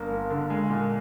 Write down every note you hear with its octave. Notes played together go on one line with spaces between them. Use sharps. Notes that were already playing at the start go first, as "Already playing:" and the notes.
Already playing: G1 A#3
A#3
D3
G#3
A#2